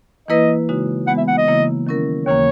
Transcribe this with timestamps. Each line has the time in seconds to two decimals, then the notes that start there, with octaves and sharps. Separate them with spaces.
0.28 E3 A#3 E4 B4 D#5
0.69 C#3 G#3 D#4 F#4
1.07 E3 G#3 B3 F#5
1.18 E5
1.28 F#5
1.38 D#5
1.47 C#3 E3 A#3 E4
1.87 D#3 F#3 C#4 E4 A#4
2.26 D#2 C#3 E3 A#3 C#5